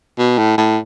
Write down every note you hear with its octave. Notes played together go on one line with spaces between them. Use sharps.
B2
A2
A2